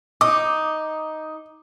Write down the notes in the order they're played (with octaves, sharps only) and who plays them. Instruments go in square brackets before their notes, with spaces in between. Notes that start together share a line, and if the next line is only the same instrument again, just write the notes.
[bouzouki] D#4 [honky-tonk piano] D6